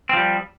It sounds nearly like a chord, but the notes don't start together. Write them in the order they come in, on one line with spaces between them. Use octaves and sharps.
C4 F3 G3